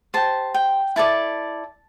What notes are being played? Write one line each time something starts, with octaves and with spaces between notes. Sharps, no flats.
G4 C5 A5
G5
E4 A4 D5 A5